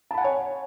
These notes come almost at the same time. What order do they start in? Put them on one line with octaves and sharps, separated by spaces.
A5 B5 F#5 G#5 C#5